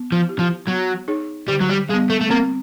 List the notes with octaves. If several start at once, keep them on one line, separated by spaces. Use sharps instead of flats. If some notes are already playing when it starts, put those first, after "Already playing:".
Already playing: B3
F3
E4 G4
F3
F#3 B3
D#4 G#4 C#5
D3 G3
F#3
G3
G3 G#3 B3
A3
A3
A#3 C4